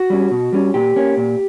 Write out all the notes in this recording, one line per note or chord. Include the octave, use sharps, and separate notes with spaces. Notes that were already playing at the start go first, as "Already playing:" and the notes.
Already playing: F#4
G3 C#4
B2
G3 C#4
A#2 G4
A#3 C#4
A#2